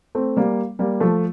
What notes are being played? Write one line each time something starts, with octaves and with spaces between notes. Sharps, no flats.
A3 C4
G3 A#3
G3 A#3
F3 A3